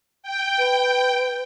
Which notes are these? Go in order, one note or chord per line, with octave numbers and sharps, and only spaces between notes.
G5
B4